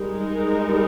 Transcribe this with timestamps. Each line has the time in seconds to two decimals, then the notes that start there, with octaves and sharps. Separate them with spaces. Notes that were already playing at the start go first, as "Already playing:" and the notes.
Already playing: G3 G#3 D#4 A#4
0.69 G3